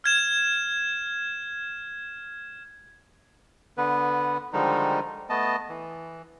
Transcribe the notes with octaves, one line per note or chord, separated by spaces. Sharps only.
F6 G#6 E7
D3 B3 B4
D3 D#3 F3 G3 G#3 D#4
A3 B3 D#5 A5
E3